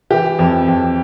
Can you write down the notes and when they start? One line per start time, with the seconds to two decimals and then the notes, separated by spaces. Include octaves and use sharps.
0.10 E3 G4
0.39 F2
0.68 F2